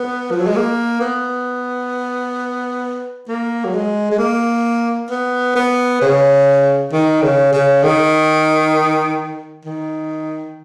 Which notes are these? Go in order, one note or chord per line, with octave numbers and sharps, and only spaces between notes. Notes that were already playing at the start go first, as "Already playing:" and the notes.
Already playing: B3
F3
F#3
G#3
A#3
B3
A#3
F#3
G#3
G#3
A#3
B3
B3
C#3
D#3
C#3
C#3
D#3
D#3